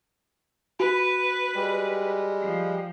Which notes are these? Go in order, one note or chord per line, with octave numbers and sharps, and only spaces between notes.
F#4 B4
G3 G#3
F3